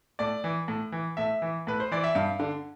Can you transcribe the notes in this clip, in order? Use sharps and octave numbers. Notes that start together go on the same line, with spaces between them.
A2 D5
E3
A2
E3
A2 E5
E3
A2 B4
C5
E3 D5
E5
G2 F5
D3